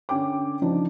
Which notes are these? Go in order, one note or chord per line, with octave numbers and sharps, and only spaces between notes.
D3 C#4 G5 D6
C#3 F3 D4 D#4